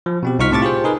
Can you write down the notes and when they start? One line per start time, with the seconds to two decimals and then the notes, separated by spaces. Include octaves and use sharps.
0.06 F3
0.23 B2 C4 G4
0.39 C2 D#4 F4 C#6 F6 B6
0.51 A2 C3 A5 C#6 D6 A6
0.62 F4 G4 G#4 C5
0.84 D#4 G#4 A#4 B4